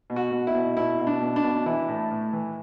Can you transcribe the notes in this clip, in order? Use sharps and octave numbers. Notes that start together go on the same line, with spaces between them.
B2
F#4
B2
E4
B2
B2 E4
B2
D4
B2
D4
B2
E3 E4
A2
A2
E3